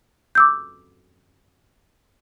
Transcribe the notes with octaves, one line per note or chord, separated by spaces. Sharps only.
D6 E6 G6